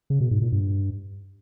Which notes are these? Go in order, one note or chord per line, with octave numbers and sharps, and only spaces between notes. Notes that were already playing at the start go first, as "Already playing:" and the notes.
C#3
B2
G#2
A#2
G2